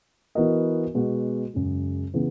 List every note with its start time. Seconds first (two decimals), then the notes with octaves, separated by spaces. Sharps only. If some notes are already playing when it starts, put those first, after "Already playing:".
0.35 E3 B3 F#4 A#4 D#5
0.94 B2 G#3 B3 F#4
1.54 F#2 C#3 G#3
2.14 C#3 E3 B3